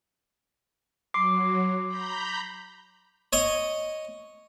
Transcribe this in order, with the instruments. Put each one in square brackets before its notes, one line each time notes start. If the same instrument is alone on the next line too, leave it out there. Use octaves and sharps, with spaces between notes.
[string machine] F#3 [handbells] C6 D6 C7
[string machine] A#5 B5 G6
[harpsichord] C#5 D#5